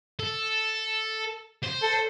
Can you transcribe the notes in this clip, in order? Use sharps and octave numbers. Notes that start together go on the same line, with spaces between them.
A4
C5
A4